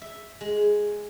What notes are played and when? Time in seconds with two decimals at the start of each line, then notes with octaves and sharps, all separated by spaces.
0.01 E5
0.41 G#3